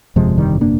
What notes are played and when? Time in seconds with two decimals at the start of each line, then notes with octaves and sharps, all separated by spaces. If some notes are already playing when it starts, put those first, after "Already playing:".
0.16 G1 F2 C3 F3 G#3
0.38 D#3 G3
0.61 A#3 D4